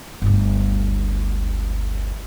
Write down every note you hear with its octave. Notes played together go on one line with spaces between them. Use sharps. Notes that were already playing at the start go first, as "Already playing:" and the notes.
G1 D2